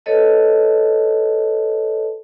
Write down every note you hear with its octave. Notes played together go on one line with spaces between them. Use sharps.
A4 B4 C#5 D#5 A5